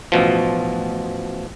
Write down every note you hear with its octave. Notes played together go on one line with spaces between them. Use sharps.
A1 B2 F3